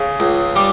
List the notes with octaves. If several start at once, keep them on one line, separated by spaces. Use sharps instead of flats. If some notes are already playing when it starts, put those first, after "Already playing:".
Already playing: C#3
C#2
G3 D5